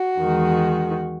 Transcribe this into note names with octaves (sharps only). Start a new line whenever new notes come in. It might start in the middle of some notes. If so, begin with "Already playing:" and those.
Already playing: F#4
E2 D#3 G#3